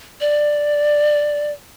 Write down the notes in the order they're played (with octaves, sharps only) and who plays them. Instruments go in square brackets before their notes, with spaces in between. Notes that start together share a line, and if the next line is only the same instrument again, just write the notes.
[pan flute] D5